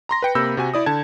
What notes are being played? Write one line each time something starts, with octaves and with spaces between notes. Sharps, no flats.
A#5 C6 A#6
B4 G5 C#7
C3 A#3 B5 E6 G6
C3 F#4 G#5
E4 D5 D#6
D3 A5 G#6